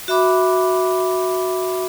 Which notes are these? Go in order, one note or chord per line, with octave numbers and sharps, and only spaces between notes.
F#4 E5 B5 D6